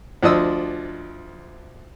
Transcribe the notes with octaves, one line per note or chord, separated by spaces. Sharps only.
D2 F3 D4 D#5 D#6 E6